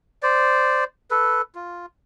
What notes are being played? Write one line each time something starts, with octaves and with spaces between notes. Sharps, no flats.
C5 D5
A4 B4
F4